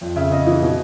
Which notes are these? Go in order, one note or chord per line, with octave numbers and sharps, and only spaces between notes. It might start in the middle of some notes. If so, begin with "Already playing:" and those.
F2
C#3 E5
C#3 D#5
E3
B2